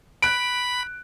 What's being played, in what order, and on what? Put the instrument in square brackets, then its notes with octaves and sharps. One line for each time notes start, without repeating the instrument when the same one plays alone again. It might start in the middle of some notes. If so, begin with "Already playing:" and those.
[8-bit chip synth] B5 [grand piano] F#6 D7